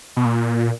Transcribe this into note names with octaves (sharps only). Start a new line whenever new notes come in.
B2
A#2